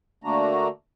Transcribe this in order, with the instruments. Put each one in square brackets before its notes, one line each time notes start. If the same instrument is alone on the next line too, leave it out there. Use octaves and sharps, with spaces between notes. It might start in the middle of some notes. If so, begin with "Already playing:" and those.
[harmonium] D3 A3 A#3 D4 F#4 A#5